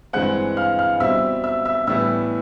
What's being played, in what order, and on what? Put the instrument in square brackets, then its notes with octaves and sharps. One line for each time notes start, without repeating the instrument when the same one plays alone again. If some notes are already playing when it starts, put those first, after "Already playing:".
[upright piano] G2 E3 G#3 C4 F#5 F#6
F5 F6
F5 F6
B2 G3 C4 E5 E6
E5 E6
E5 E6
A2 E3 G3 B3 E5 E6